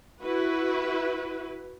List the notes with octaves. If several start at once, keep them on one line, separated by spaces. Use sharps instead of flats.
E4 F#4 B4